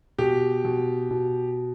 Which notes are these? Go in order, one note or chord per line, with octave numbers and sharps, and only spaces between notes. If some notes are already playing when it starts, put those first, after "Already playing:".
B2 G4
B2
B2